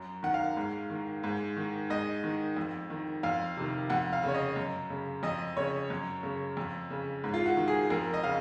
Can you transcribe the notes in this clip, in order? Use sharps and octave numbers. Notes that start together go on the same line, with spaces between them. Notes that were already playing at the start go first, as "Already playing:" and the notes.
Already playing: F#2
D#3 F#5
F5
G#2
D#3
G#2
D#3
G#2 D#5
D#3
F2
D#3
F2 F5
C3 D#3
F2 F#5
F5
C#3 C#5
D#5
F#2
C#3
F2 D#5
C#3 C#5
F#2
C#3
F2
C#3
G#2
F4
F#4
D#3
G#4
F2 A#4
D#5
C#3 F5